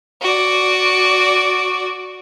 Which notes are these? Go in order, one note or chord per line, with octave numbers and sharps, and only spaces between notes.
F#4 D5